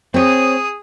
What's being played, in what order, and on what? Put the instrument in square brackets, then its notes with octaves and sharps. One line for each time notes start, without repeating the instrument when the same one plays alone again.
[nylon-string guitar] C4 C#5 [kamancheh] G#4 D#6